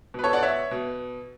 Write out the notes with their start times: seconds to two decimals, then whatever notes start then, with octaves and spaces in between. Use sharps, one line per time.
0.14 B2 B4
0.24 A4 C#5
0.33 D5 F#5
0.43 C#5 E5
0.71 B2